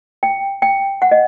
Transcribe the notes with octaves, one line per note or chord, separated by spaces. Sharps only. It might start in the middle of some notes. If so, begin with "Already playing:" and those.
G5
G5
F#5
D#5